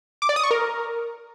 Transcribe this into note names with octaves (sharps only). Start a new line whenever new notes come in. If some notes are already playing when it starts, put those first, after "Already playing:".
D6
D5
D#6
C#6
A#4